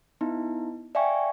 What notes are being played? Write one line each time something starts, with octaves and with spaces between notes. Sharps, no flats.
B3 D#4 E4
D5 E5 F5 G5 G#5 C#6